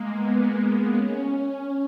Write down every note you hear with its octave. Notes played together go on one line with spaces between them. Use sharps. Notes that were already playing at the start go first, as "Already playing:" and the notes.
Already playing: G#3 A#3
B3
B3
C#4